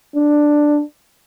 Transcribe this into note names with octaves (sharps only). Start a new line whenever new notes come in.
D4